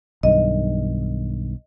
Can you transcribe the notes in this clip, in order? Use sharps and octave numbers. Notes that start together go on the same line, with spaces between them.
B1 G2 D#3 D#5